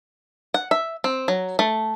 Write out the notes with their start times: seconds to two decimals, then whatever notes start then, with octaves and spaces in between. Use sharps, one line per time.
0.54 F#5
0.71 E5
1.04 C4
1.28 F#3
1.59 A3